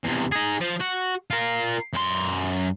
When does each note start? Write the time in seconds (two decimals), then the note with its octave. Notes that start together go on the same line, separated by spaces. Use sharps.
0.04 E2 C3
0.32 D#4 G#4
0.61 F3
0.81 F#4
1.30 F4 A#4
1.93 F#2 C6